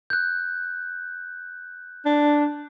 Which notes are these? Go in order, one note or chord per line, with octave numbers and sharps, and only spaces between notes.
F#6 G6
D4